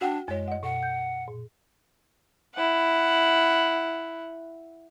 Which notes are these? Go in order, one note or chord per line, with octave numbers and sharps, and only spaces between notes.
D4 F#4 F#5 G5
F#2 G#3 C#5
D#5 F#5
B2 F#5
G6
A#2
E4 F#5